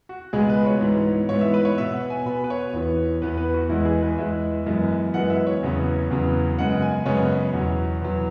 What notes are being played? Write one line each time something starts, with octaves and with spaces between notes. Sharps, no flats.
F#4
C#2 B2 G#3 B3 G#4
B4
C#5
G#2 E3 B3
G#2 E3 B3 C#5
E5
B4
C#5
B2 B3 E5
F#5
G#5
B2 B3 B5
B4
C#5
E2 E3 B3
E2 E3 B3 B4
B4
F#4
E2 E3 G#3 E4
G#4
B4
E2 E3 G#3 E5
F#2 E3 G#3 B3
F#2 E3 G#3 B3 F#5
E5
C#5
E2 C#3 F#3 B3
E2 C#3 F#3 B3
F#2 C#3 G#3 B3 F#5
G#5
F#2 C#3 G#3 B3 C#5
E2 B2 F#3
E2 B2 F#3